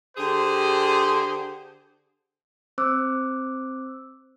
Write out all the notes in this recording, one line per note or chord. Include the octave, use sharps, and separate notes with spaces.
D3 G4 G#4 C5
C4 C5 D6 E6 F#6